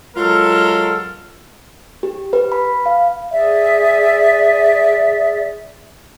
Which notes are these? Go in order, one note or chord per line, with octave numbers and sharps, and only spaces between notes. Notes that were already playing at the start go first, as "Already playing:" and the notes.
F#3 G#3 F4 A4 A#4
G4
B4
B5
F5
G#4 D5 E5